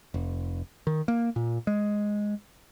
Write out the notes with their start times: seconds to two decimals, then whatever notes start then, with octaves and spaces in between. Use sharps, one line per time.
0.14 F1
0.87 D#3
1.08 A#3
1.36 A#2
1.67 G#3